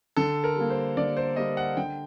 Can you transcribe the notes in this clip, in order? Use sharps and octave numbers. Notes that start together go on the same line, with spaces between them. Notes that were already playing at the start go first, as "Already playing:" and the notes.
D3 A4
A#4
G3 A#3
C5
D3 D5
C5
G3 A#3 D#5
F#5
D3 G5